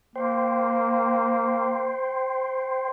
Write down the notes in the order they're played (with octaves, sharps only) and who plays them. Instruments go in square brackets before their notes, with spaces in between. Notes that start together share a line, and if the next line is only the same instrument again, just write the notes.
[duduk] A#3 [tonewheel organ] C5 G5 C6